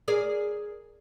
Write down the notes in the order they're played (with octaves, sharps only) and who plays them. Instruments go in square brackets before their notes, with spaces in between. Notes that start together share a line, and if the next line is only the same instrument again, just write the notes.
[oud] G#4 A#4 D5